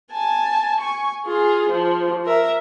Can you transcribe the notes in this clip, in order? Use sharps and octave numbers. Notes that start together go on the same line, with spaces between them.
G#5 A5
G#5 C#6
F4 G#4
F3
A#4 E5